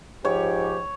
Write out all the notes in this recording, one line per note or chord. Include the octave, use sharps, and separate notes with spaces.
G#2 F3 G4 C#5